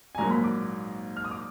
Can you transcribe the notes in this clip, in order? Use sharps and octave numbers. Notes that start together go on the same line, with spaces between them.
G#5
A#1 G#2 F#3 A#3 A#5
B5
D6
F6
D#6
D6